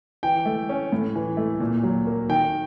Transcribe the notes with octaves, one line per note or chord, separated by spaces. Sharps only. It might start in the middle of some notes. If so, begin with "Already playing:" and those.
E3 G5
A3
C#4
A2
E3
A3
A#2
F#3
A#3
D#3 G5